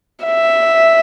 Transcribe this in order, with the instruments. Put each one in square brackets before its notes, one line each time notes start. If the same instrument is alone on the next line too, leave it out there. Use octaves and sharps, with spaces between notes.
[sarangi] E5